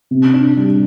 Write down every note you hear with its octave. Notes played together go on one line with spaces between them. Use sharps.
C3
D4
G3